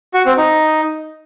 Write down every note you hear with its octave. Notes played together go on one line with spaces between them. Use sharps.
F#4
C4
D#4